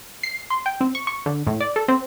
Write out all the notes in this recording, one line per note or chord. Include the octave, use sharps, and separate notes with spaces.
C7
C6
G5
C4
C#6
C#6
D3
A2
D5
A4
C4